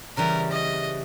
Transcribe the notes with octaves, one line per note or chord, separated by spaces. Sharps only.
C#3 E3 G3 A#4
D#5